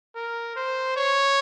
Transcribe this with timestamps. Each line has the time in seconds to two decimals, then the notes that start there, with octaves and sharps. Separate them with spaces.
0.16 A#4
0.56 C5
0.96 C#5